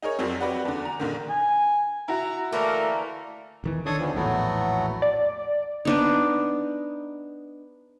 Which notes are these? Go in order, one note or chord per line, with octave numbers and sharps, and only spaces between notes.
D#4 G#4 A#4 C#5
F2 F#3 G3 C4
F#4 G4 B4 D5 F#5
E2 D3
A#5
A#1 D3 D#3
G#5
E4 F#4 A#5
D3 E3 A3 A#3 A#4
E1 D#3 E3
D3 D#3 D4 A4 C#5 D#6
E2 E3 F3
A#1 E2 A2 F#3 A3 B3
D5
B3 D4 D#4